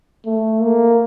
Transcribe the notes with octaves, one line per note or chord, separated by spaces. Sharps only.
A3
A#3